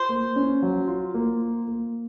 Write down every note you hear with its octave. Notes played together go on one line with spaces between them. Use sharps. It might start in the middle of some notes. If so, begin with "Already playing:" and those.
Already playing: F4 C5
A#3
C#4
F#3
F4
A#3
F4
A#3